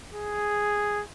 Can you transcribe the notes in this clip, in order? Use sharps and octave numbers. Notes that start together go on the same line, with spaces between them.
G#4